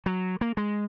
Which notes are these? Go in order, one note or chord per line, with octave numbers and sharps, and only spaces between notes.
F#3
A#3
G#3